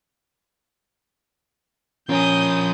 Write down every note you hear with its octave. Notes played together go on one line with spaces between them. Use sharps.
F3 C#4 A#4 C#5 G#5 D#6 G6